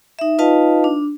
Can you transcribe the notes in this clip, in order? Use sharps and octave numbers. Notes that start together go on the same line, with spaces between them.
D#4 E5
D#4 F4 B4 D#5 F5 A5
D4